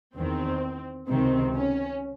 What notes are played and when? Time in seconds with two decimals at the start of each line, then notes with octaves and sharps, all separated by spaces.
0.15 E2 D#3 C4
1.08 C#2 C3 D#3 C4
1.55 C#4